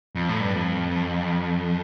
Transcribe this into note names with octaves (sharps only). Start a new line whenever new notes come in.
F2
A2
G2
F2